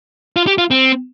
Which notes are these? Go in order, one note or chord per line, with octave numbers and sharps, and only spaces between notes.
F4
G4
F4
C4